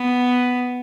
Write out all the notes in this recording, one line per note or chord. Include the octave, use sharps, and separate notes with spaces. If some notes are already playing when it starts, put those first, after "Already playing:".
Already playing: B3